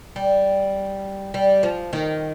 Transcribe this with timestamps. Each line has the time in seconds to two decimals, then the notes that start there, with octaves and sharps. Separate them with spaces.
0.16 G3
1.34 G3
1.63 F3
1.93 D#3